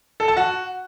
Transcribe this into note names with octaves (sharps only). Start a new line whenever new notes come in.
A4
A5
F#4